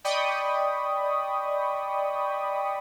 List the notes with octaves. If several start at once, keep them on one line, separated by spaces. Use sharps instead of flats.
D5 D#5 G5 B5 C#6 D#6